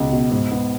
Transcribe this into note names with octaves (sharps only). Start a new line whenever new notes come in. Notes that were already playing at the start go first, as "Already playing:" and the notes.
Already playing: C#2 B2
B2
G#2
B3